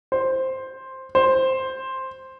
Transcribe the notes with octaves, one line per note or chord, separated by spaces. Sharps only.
C5
C5